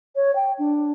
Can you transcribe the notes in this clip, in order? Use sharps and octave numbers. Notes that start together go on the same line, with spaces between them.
C#5
G5
D4